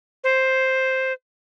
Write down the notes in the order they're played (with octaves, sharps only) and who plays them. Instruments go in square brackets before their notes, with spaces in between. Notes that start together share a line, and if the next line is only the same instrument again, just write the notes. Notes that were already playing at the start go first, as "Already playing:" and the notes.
[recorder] C5